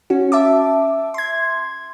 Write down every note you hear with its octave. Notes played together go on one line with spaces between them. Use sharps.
C#4 F#4
E5 A5 D6
C6 G#6